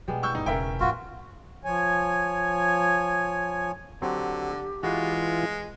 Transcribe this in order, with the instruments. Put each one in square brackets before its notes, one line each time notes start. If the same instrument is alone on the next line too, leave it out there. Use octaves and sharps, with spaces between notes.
[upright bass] B2 [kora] G3 G#3 B3
[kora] E4 [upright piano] C#6 E6 G6
[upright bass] G1 [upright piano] D#4
[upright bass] E1 C#3 [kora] C#4 C#5 [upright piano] A#4 E5 G5
[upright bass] F2 A2 [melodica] F4 F#4
[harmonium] F3 C#5 G#5
[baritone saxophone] D3 [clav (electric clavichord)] F#3 C4 [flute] G4
[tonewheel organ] E3 F4 [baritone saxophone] G#3 [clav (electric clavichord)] F#4 B4 F5